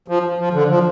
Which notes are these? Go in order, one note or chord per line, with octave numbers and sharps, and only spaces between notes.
F3
F3
D3
F3